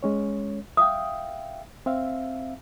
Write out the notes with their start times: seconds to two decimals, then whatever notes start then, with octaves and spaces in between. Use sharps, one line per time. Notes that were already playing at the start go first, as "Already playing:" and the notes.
0.03 G#3 C#4 C#5
0.77 E5 F5 G5 D#6
1.86 C4 E5 F5